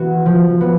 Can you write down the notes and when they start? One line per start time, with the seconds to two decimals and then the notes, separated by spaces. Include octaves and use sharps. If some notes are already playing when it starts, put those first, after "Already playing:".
Already playing: E3 B3 F#4
0.26 F3
0.61 B3